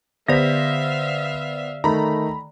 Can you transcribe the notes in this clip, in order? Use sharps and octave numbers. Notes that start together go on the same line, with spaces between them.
D3 B3 C5 D5 E5 F5 A#6 B6
D#3 A3 A#5 B5